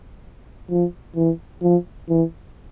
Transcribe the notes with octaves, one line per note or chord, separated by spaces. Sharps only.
F3
E3
F3
E3